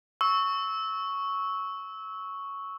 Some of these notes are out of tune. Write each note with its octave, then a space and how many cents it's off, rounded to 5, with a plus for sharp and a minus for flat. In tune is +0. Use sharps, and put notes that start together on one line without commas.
C#6 +0 E6 -20